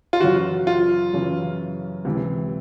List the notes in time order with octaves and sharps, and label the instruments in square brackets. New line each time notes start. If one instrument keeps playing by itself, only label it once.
[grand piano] F4
[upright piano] F#2 C#3 E3 [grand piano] F#4
[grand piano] F4
[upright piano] F#2 C#3 E3
C#2 C3 E3